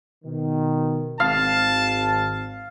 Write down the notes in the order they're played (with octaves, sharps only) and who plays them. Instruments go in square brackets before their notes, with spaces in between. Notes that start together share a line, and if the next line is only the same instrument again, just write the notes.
[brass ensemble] B2 D#3
[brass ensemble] G#1 C4 [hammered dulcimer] F5 [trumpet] A5